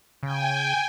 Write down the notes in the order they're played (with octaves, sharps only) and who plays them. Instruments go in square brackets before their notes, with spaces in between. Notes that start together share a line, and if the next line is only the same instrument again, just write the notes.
[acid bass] C#3 [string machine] G5 G#5